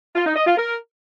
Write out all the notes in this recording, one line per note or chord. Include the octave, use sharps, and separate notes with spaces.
F4
D#4
D#5
F4
A#4